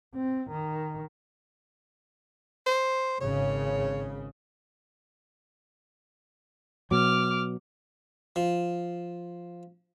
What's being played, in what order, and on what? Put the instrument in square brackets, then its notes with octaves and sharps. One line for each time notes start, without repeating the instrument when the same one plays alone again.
[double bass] C4
D#3
[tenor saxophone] C5
[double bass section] G#1 C#3 [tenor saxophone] C#5
[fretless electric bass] B2 F#3 [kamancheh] D6 F6
[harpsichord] F3